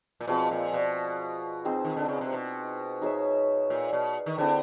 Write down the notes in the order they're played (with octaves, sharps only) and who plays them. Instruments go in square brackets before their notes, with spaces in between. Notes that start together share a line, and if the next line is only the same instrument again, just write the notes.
[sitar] A#2
[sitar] B2 [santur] F3 G#3 C4
[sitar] A#2
B2
[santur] C4 D#4 G#4 C5
[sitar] D#3
D3
C#3
C3
B2
[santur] D#4 G#4 C#5 E5
[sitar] A#2
B2
D#3
[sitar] D3 [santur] C4 E4 G#4 C5